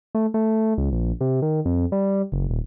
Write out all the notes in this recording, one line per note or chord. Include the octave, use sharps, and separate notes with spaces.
A3
A3
C#2
A#1
C3
D#3
F2
G3
F#1
D#1